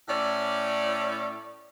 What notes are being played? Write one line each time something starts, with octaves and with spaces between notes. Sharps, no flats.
A2 C#4 D5